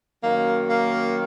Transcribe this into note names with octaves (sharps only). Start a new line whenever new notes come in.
F#2 D#3 F#3 A#3
A#3